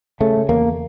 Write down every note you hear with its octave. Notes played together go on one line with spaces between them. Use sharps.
C#3 A3
E2 A#3